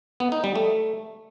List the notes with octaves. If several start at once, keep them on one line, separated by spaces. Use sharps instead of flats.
B3
D#4
G3
A3